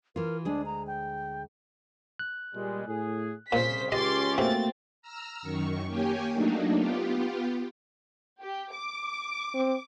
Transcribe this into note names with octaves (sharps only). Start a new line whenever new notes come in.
E3 F4 A#4
D2 G#3 D4 G#4
A#5
G5
F#6
A#2 G3 G#3
A2 G#4
C2 A#2 C#3 C5 B6
C#2 C#4 G4 D#5 C6 D6 A6
C3 A3 A#3 C4 F#4 A6
A#5 E6 F6
F#2 D#3 C#6
A#3 G4 C#5 G5 G#5
F#3 A3 A#3 D4 D#4
B3 F4 G4
G4
D6
C4